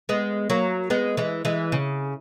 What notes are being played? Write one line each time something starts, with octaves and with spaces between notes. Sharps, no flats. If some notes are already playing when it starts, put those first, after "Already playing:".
G#3 B3
F#3 A#3
G#3 B3
E3 G#3
E3 G#3
C#3